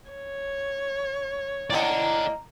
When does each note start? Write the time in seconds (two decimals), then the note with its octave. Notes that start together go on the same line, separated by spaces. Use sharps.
0.11 C#5
1.70 A2 A#3 D5 D#5 F#5 A#5